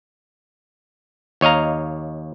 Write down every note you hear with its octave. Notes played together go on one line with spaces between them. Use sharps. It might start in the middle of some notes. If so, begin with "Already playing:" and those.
D#2 C#5 D#5 F5 A#5